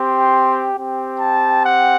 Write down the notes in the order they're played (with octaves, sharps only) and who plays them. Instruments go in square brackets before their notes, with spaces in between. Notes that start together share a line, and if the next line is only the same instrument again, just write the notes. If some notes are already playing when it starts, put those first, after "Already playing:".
Already playing: [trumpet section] C4 G4 C6
C4 G4
A5
F#5